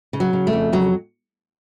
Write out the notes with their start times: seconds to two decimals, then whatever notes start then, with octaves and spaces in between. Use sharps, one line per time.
0.13 C#3
0.20 F#3
0.33 C#3
0.47 A3
0.53 F2
0.73 C#3 F#3